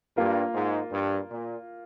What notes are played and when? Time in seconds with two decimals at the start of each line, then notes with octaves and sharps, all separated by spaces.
0.17 G2 A#3 F4 A#4
0.54 G#2
0.92 G2
1.30 A#2